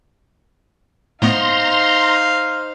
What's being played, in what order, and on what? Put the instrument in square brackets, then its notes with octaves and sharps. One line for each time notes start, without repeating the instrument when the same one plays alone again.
[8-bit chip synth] A2 A3 B3 [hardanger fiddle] D#4 C5 [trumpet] F5 [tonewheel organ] A#5 C6